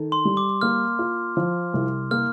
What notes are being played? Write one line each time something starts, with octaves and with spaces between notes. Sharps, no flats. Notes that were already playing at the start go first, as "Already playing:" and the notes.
Already playing: D#3 A4
C6
G3
D6
A#3 F6
F4
F3
C2
A#3 F6